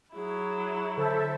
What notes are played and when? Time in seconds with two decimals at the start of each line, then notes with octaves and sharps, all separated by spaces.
0.15 F#3 E4 G#4
0.97 D3 A4 C5 E5 G5 A5